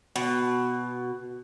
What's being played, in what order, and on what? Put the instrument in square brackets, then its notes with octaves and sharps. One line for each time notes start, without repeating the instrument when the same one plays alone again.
[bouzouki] B2